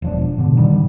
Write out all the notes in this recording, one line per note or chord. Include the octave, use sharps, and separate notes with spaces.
E1 F3 D4
G#2 B2 D3
D#3 G3